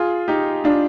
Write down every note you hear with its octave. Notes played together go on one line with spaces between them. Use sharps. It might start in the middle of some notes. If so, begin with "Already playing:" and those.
Already playing: F4 G#4
D#4 G4
D4 F4